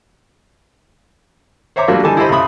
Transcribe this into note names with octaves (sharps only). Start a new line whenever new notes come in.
C5 C#5 E5 A#5 D6
F#3 G3 A3 A#3 D4 F4
D3 E3 G3 D#4 G#5 A5
E4 G4 A4 C5 D#5 B5
C#2 A2 C#3 E5 B5 D#6